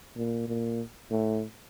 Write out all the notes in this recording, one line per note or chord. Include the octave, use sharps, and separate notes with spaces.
A#2
A#2
A2